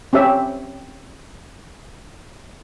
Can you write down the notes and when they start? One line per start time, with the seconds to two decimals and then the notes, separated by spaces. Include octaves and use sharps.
0.13 C4 C#4 G4 E5